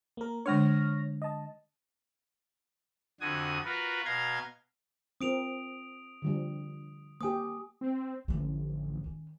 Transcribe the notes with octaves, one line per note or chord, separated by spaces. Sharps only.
A#3 A#4
D3 G#3 D4 C#5 F6 A#6
D#5 A5
F2 D3 F#4 G#5 D#6
F4 F#4 A#4 B4
B2 F5 A#5 C6 G#6
C4 F4 A#4 D#6 D7 F7
D3 F3 G3
A#3 G4 G#5 D#6
C4
A1 D3 F3
D#3 C#4